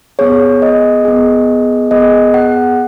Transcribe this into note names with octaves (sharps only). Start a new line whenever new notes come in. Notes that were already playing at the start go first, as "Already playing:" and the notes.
B3 G#4 C#5
D#5
B3 G#4
B3 G#4 D#5
F#5